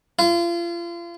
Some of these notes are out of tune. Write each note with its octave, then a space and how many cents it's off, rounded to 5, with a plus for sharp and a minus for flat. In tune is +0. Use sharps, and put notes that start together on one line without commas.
F4 -35